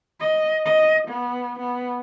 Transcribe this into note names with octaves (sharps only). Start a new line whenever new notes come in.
D#5
D#5
B3
B3